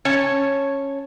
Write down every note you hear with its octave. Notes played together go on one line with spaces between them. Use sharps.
C#4 C#5 A5